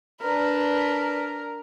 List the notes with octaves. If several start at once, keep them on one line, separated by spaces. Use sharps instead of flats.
D4 A#4 B4